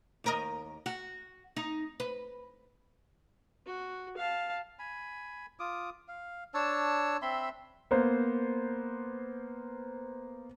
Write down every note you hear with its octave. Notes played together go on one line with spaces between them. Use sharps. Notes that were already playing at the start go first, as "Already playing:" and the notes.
D#2 A#4 D#5
F#4
D#4
B4
F#4
F5 A5
G#5 B5
F4 D6 D#6
F5
D4 C#5 A5 E6
C4 E5 B5 C6
A#3 B3 C5